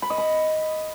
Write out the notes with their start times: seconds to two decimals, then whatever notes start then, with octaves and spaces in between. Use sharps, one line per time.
0.02 B5
0.10 D#5
0.18 B5